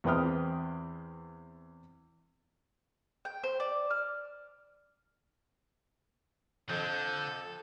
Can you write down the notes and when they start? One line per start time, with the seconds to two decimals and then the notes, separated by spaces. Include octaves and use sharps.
0.04 E2 C4 B4 G5 D#6 F6
3.25 G5
3.44 C5
3.60 D5
3.90 F6
6.69 F2 D3 A4 G6